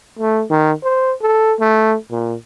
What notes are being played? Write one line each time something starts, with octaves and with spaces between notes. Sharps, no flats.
A3
D#3
C5
A4
A3
A#2